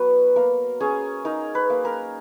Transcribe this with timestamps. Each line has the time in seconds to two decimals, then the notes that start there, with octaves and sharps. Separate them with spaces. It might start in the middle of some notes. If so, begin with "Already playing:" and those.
Already playing: F#3 B3 B4
0.36 A#3 A#4
0.80 C#4 G#4
1.25 D#4 A#4
1.55 B4
1.70 A#3
1.85 A#4